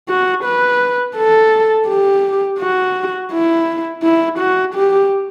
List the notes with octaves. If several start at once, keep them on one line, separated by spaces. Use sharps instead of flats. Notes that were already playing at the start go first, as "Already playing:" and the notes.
F#4
B4
A4
G4
F#4
E4
E4
F#4
G4